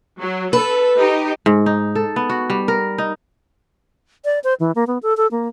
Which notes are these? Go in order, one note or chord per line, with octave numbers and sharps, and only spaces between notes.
F#3
A4 B4
D#4 G4
G#2
D#4
A4
B3
F#4
G3
A#4
D#4
D5
C5
E3
A#3
B3
A4
A4
A#3